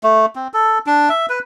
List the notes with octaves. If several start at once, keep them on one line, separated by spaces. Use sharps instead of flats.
A3
C4
A4
D4
E5
B4